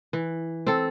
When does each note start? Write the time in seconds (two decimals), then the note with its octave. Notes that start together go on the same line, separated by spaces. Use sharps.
0.13 E3
0.67 C4 A4